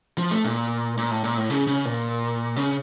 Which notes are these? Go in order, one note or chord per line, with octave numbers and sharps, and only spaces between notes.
F3
A3
A#2
A#2
A2
A#2
A2
C#3
C#3
A#2
C#3